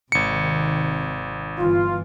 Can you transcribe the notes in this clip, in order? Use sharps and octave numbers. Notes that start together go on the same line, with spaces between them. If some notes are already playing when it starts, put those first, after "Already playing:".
G#1 C3 D#3 C#7
G1 E3 F4